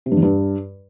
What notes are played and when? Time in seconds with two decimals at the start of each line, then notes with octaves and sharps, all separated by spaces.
0.06 C3
0.11 G2
0.17 E2
0.22 G2